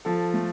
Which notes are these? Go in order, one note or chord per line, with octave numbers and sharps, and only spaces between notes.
F3 A4
A3